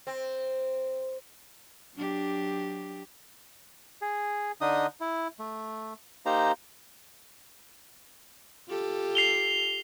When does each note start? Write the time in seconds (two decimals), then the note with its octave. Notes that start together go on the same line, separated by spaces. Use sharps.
0.07 C4
1.95 F#3 D4 G4
4.02 G#4
4.61 D3 D4 D#4 D#5 D#6
5.01 E4
5.39 A3
6.26 A#3 D#4 G4 C5 A#5
8.68 F4 G4 A4
9.15 C7 F7 G7